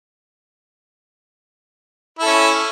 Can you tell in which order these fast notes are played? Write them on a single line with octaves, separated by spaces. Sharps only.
E4 A4 C#4